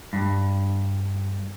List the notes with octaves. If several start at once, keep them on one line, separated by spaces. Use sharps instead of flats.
G2